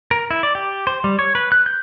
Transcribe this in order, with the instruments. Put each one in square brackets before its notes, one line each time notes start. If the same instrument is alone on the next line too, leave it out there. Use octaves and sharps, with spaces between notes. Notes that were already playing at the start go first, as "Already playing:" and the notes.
[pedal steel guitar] A#4
E4
D5
G4
C5
G3
C#5
B4
F#6
G6